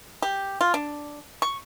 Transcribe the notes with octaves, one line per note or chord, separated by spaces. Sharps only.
G4
F4
D4
C#6